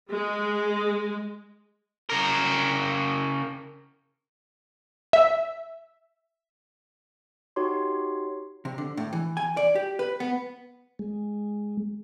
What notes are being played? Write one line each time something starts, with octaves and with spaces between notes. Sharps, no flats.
G#3
C#3 A#4
E5
D#4 F#4 G4 C#5 C6
C3
D3
A2
E3
G#5
D5
G4
B4
B3
G#3